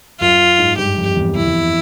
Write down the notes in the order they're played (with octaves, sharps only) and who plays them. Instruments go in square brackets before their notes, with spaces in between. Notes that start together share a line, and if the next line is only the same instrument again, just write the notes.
[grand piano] F#2 [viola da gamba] F4
[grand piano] G#2
[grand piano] G2 [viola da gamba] G4
[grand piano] F2
E2
[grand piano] F2 [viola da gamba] E4
[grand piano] E2